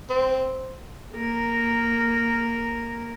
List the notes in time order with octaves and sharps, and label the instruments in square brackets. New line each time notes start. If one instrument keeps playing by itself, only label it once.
[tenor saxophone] C4
[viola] A#3 A#4